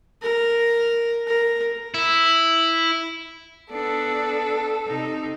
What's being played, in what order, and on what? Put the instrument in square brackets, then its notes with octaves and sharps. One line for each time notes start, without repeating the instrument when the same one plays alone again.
[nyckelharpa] A#4
A#4
[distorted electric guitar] E4
[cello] B3 D4 [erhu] A4
[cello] C3 D#4